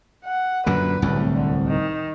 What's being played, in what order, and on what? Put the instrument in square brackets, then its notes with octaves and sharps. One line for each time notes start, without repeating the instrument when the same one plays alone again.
[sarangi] F#5
[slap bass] F#2 A#2 D3 [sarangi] B4
[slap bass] D1 C2 A2
[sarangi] D3
D#3